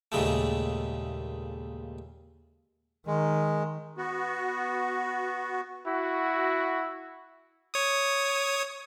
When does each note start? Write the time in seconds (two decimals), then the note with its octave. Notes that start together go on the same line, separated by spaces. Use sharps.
0.12 D#2 A#2 C#3 G#3 A3
3.07 D#3 G#3
3.97 B3 F#4
5.87 E4 F#4
7.74 C#5 D#6